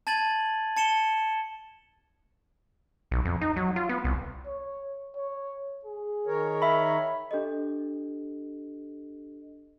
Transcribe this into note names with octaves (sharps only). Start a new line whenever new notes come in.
A5 G#6 A6 D#7 F#7
A5 C#7 E7 G7
B1
F2
D#4
F#3
F4
B3
C2
C#5
C#5
G#4
D#3 A#4 C#5
E5 B5
D4 G4 A4 D#5